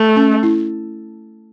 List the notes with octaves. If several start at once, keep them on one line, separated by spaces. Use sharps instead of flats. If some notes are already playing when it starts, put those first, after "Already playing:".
Already playing: A3
C#4
E4